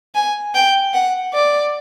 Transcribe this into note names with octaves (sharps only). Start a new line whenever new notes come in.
G#5
G5
F#5
D5